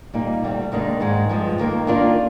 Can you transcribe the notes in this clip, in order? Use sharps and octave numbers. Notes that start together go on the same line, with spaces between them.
A#2 G3 A#3 D#4
D2 C3 G3 C4
D#2 D#3 G#3 D4
G#2 D#3 G#3
G2 F3 G#3
D#2 D#3 A#3
D#3 A#3 D4 F4